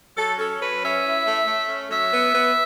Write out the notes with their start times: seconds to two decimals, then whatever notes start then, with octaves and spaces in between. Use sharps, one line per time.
0.18 F#3 A4
0.39 C#4 A4
0.60 F#3 B4
0.82 C#4 E5
1.05 E4
1.27 A3
1.47 A3
1.69 C#4
1.91 F#3 E5
2.13 B3
2.34 B3